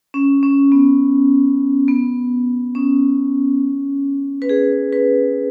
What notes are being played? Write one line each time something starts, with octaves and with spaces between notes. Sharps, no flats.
C#4
C#4
B3
B3
C#4
B4
G#4
B4